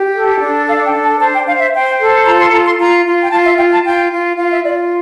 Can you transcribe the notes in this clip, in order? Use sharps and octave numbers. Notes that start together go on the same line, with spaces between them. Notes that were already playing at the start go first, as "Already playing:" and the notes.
Already playing: G4
A4
D4
A4 F5
G5
D4
A5
C5 A5
G5
C5 F5
E5
C5 G5
A4
F4 A#5
C6
F4 A#5
C6
F4 A#5
F4
G5
F4 A5
E5
F4 G5
A5
F4 G5
F4
F4 F5
E5
F4 D5